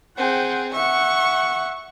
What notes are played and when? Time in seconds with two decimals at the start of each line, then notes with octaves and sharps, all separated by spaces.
0.17 C4 G#4 F#5 G5
0.74 E5 F#5 C#6